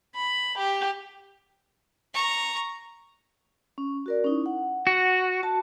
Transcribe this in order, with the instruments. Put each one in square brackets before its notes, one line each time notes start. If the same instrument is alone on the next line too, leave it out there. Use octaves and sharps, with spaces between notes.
[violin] B5
G4
[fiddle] A#5 C#6
[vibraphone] C#4
F#4 A#4 D5
C#4 D#4 E4
F#5
[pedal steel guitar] F#4
[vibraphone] F#4 A5